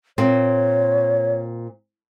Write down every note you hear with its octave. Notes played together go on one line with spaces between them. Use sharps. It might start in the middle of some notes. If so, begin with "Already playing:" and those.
A#2 C4 C#5